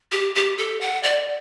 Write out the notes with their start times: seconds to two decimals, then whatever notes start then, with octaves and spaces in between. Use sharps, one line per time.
0.12 G4
0.35 G4
0.58 A4
0.81 F#5
1.03 D5